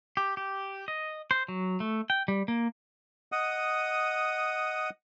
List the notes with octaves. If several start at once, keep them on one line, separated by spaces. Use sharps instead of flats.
G4
G4
D#5
C5
F#3
A3
G5
G3
A#3
D#5 F#5 D#6